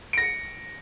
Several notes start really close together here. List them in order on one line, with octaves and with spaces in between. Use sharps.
D7 A#6 C#7